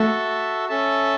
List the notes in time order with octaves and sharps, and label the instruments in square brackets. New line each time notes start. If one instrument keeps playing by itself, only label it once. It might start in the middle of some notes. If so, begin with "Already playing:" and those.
Already playing: [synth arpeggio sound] A3 [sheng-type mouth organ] F#4 A4 E5 A5
[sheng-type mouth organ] C#4 A4 E5 A5